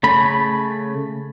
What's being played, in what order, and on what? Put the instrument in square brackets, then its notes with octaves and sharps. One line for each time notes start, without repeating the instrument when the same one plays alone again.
[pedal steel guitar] C#3 A3 B5